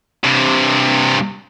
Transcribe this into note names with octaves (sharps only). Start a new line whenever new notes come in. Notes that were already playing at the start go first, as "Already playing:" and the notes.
G2 C3